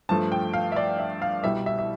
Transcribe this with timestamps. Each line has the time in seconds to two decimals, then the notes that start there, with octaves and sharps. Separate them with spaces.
0.09 G2 F3 A3 A5
0.32 G5
0.53 F5
0.72 E5
0.76 D5
0.99 E5
1.22 F5
1.43 C2 B2 G3 E5
1.66 E5
1.79 E5